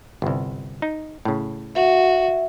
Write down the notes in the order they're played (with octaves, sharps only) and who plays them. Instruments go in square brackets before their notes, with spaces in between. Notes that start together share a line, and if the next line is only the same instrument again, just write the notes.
[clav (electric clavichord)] G1 C2
D#4
A2 C#3
[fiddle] F#4 [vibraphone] E5